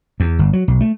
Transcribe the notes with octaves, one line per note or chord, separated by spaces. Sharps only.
E2
G1
F#3
B1
A3